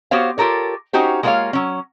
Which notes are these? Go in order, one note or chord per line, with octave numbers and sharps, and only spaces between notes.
B3 F#4 G4 C5 C#5 F5
F4 G4 A4 A#4 C#5
C#4 D#4 F#4 G4 C5
G#3 A#3 F4 A4 C#5 F5
F#3 C#4